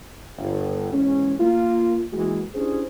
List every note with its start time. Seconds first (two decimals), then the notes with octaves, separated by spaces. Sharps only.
0.37 G1
0.91 E2 G#2 G#3 C#4
1.39 A#3 F4
2.12 E3 G#3 A#3 F#4
2.54 C#4 D4 E4 G4 G#4 C5